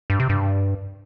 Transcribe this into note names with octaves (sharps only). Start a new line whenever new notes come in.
G2
C3
G2